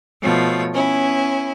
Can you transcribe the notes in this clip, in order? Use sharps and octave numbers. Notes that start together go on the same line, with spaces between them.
B2 F3 A3 C#5
B3 C#4 E4